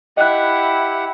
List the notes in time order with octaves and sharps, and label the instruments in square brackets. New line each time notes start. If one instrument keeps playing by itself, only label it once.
[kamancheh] E4 [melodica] G4 F#5 [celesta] D#5 F#6